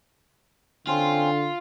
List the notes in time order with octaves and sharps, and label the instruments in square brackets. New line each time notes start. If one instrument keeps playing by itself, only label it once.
[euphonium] D3 [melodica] C4 C#4 [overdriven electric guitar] F4